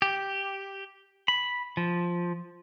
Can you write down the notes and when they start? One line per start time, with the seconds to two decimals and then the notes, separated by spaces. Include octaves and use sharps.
0.02 G4
1.28 B5
1.77 F3